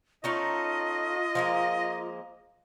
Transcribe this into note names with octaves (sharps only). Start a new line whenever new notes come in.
A3 C#4 D#4 F4 D#5
F3 G#3 A#3